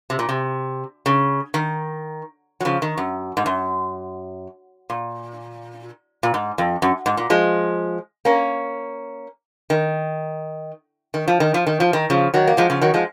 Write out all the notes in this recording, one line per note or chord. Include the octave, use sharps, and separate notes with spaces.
C3
A#2
C3
C#3
D#3
F#3
C#3 F3
D#3
F#2
G#2
F#2
A#2
A#2
G#2
F2
F#2
G#2
A#2
F3 G#3
A#3 C#4
D#3
D#3
F3
D#3
F3
D#3
F3
D#3
C#3 F3
D#3 F#3
A#3
F3 G#3
C#3 F3
D#3 F#3
F3 G#3